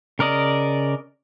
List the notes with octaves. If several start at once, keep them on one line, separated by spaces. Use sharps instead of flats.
C#3 A#4 D5 D#5